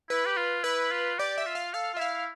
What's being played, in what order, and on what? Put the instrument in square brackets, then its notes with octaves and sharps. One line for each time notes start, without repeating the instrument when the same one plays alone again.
[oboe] E4 [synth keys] B4
[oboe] G4
F4
[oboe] E4 [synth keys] B4
[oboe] F4
[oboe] G4 [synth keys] D5
[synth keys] E5
[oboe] F4
[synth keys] F5
[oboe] A4 [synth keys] F5
[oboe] F4
[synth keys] E5
[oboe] E4 [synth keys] F5